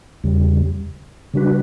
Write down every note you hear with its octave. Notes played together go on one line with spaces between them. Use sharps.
E2 C#3 G3
C#3 G3 D4 F#4 B4